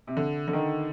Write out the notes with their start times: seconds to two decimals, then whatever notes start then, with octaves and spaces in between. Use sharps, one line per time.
0.07 C3
0.17 D3
0.48 D3
0.53 D#3